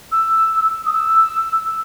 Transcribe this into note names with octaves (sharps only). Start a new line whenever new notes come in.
E6
D#6
E6